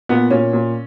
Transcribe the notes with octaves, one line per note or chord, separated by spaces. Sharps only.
A#2 B3
A#2 C#4
A#2